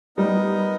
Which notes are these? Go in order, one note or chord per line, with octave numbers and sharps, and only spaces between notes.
G3 B3 D#4 A#4 D#5